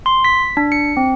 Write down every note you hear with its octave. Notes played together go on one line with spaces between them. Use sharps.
C6
B6
D4
C#7
C4